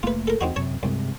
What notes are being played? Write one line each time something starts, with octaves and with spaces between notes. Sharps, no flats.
F1 A3 A#3 F4 B4
A4 A#4
E2 C4 D#4 F#4
F#2 C3 C#5 A5
C2 G2 C3 G#3